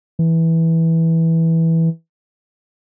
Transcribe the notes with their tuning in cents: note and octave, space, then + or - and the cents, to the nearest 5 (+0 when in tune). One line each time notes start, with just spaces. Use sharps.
E3 -10